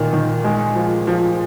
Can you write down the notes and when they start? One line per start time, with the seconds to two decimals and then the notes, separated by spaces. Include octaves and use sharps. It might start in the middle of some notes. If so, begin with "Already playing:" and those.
Already playing: A#2 D#3
0.13 D#3
0.44 G#3
0.75 F3
1.07 F3